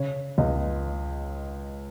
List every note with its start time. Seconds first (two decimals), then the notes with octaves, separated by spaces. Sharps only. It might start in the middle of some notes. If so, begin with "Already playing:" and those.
Already playing: C#3 C#5
0.38 C#2 D#5